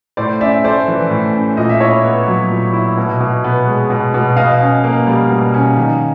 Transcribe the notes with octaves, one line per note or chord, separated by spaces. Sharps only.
A2 C5 D5
C#4 D5 E5
A3 C5 D5
E3
A2
C#4
A#2 D#5
E5
E4 C#5 D#5
B3
F#3
A#2
E4
B2
B2
B3
G#3
B2
B2
B2 D#5 F5
C#4
A#3
G3
B2
C#4
D#3